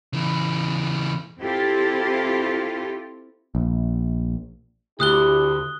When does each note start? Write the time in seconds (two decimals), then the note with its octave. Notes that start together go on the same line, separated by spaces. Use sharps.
0.13 C#3 E3
1.41 C4 E4 F4 G4 A4
3.55 A#1
5.00 D2 D4 E4 G4 D#6 F#6 G7